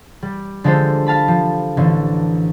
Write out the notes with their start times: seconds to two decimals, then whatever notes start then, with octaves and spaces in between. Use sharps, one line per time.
0.23 G3
0.64 D3 F3 G#3 G4 A4 C5
1.06 F5 A5 B5
1.28 F3
1.77 A1 D3 E3